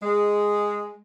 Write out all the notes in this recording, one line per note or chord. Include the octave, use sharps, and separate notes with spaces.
G#3